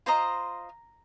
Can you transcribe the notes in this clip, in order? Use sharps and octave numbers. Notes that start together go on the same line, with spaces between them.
F4 C5 D#5 A#5